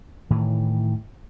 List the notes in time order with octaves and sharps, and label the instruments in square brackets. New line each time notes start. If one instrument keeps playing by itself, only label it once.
[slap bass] A2 D#3 E3